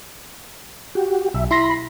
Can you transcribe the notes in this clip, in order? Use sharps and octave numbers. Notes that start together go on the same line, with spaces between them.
F#4 G4
B1 E5
E4 B5 C6 A#6